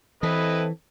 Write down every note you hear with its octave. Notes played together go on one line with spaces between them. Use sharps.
E3 C4 E4 A4 B4 D#5